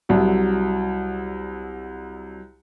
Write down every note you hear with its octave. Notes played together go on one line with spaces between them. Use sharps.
C2 F#3